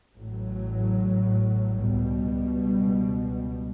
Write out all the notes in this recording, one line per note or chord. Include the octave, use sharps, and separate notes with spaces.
A1 A2 F#3
C#2 B2 G3